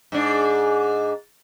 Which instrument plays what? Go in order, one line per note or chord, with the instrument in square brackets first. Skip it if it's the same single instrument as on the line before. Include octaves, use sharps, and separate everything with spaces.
[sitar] G#2 D4